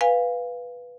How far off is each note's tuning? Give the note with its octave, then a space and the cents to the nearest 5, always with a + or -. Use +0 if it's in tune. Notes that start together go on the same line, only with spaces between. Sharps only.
B4 +0 F5 +0 G#5 -25